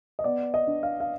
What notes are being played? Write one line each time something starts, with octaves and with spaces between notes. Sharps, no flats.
D#5
B3 D5
D#5
D4
F5
F5